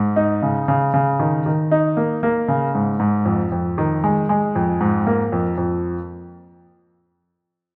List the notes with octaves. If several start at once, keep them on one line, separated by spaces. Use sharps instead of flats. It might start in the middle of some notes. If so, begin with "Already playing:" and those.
Already playing: G#2
D#4
C#3
C#3
C#3
D#3
D#3
D#4
A#3
A#3
C#3
G#2
G#2
F2
F2
D#3
G#3
G#3
F2
G#2
A#3
F2
F2